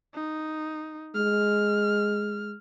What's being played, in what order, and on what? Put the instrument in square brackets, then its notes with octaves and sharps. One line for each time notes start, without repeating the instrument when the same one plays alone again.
[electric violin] D#4
[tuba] G#3 [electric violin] F6